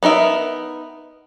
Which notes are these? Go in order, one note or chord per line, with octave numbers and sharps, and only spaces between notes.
B3 D#4 A#4 E5